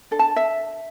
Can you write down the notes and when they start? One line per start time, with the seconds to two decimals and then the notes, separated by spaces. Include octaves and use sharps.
0.11 D4 A4
0.19 A5
0.36 E5